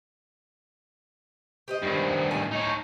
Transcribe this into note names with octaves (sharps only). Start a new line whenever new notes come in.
G4 C5 D#5
G2 D#3
A2 G#5 A5
D#4 C#5